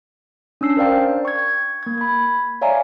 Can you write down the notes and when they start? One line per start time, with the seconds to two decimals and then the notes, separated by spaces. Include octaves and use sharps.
0.61 C#4 D4 E6 C7
0.77 A#4 C5 D5 F5 G5
1.25 C#6 G#6
1.83 A#3 G#6
1.98 B5 G#6
2.61 C#5 D5 E5 F5 G#5 A#5